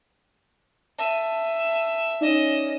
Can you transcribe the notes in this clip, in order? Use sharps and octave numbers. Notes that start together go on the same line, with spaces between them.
E5 A5 D#7
C#4 D#4 D5 D#5 E7